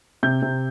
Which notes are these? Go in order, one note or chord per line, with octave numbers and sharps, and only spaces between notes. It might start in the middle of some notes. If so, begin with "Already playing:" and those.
C3 G6
C3